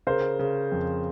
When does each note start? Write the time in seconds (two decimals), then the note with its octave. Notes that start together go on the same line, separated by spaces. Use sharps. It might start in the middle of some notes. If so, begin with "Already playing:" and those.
0.07 C#3 A#4 C5
0.39 C#3
0.72 F2